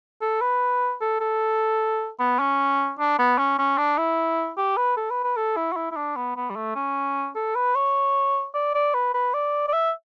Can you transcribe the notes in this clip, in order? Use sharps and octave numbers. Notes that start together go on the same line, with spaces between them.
A4
B4
A4
A4
B3
C#4
D4
B3
C#4
C#4
D4
E4
G4
B4
A4
B4
B4
A4
E4
F#4
E4
E4
D4
B3
B3
G3
A3
C#4
A4
B4
C#5
D5
D5
B4
B4
D5
D5
E5